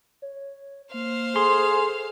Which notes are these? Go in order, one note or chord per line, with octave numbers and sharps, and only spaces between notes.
C#5
A#3 C5 F5
G#4 A4 C6